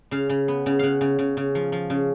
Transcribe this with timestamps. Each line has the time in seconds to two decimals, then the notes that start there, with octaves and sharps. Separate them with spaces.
0.11 C#3 F5
0.29 C#3
0.48 B3
0.66 C#3
0.79 C#3 F5 F#5
1.01 C#3
1.19 C#3
1.37 C#3
1.55 F3
1.72 F3
1.90 C#3